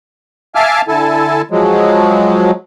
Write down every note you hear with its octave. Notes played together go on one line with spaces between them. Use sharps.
E5 F5 G#5 A5 D6 F6
D3 E4 A4 G#5 A5
F3 F#3 G#3